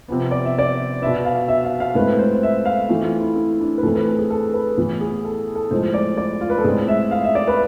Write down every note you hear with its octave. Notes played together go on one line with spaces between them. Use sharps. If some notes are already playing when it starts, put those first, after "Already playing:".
C3 F3 B3
D5
E5
D5
B2 B3 E5
F5
E5
F5
F5
A2 G#3 C4 B4
C5
E5
F5
E3 A3 C4
F4
E4
E4
D4
B4
A2 E3 A3 C4 A4
B4
A4
G#4
A4
B4
A2 E3 B3
G#4
A4
A4
A2 F3 G#3 C5
D5
D5
F4
B4
A4
A2 G#3 C4 G#4
E5
F5
E5
D5
B4